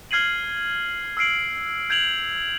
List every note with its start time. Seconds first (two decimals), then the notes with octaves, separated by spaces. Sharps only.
0.11 F6 G#6 C7 D#7 F#7
1.17 E6 F6 C7 D7 F#7
1.90 G6 G#6 D7 F7 F#7